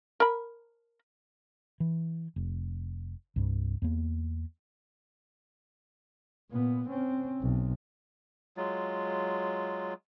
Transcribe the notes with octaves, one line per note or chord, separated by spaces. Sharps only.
A#4 B5
E3
F1
C2 G2
E2 A#3
A#2 B3
C4 C#4
B1
F#3 G#3 F4